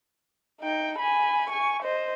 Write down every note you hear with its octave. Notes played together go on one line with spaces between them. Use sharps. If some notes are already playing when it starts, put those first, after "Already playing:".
D#4 G5
G#5 B5
G#5 C#6
C5 D#5